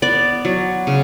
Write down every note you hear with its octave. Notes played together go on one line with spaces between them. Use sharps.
B3 D5
F#3
C#3